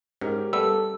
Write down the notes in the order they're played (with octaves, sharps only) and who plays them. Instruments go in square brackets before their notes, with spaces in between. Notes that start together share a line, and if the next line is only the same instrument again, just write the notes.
[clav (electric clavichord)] G#2 [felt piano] C#4 G4 A#4
[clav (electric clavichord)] G3 A3 B3 [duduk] A4 [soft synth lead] E6